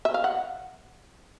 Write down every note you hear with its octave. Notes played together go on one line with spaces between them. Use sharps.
E5
F5
F#5